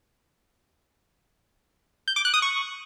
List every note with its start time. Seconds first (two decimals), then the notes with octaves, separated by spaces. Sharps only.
2.08 G6
2.16 D6
2.25 F#6
2.34 D#6
2.42 C#6